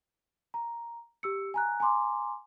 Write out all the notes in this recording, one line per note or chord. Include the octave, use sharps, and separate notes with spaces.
A#5
G4 E6 C#7
G#5 A#5 F#6
G#5 A#5 C6 D6